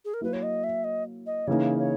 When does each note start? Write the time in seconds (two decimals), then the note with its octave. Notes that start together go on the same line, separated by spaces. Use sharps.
0.05 G#4
0.14 A#4
0.21 F#3 A#3 E4 B4
0.33 C#5
0.43 D#5
0.64 E5
0.84 D#5
1.26 D#5
1.47 C#3 E3 A#3 D#4 C#5
1.79 C#5